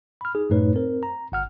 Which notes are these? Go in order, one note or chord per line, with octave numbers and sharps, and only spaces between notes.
B5 F6
D#4 G#4
F#2 A2 A3 D#4 B4 C#5
C4 A#4 C5
A#5
G1 F#5 F6